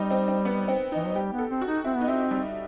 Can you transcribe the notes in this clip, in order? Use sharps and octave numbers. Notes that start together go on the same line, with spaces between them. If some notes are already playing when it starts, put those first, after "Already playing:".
Already playing: G3 C4 D#4
C4
C4
B3
C4
E3 D#4
F#3
G3 G4
B3
A4
C4
F#4
D#4
C4 E4
B3
D#4
C4 E4
G3